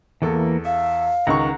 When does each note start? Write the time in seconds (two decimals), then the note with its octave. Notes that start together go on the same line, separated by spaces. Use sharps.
0.22 E2 E3 A#3 A4
0.65 E5 F5
1.27 C#2 D#3 F#5 A#5 C#6